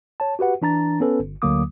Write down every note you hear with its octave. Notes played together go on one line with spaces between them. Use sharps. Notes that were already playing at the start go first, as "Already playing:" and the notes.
C#5 A5
F#4 G4 B4 F#5
E3 D4 A#5 A6
B3 C#4 A4 B4
G1
D2 D3 F#3 A#3 D6 D#6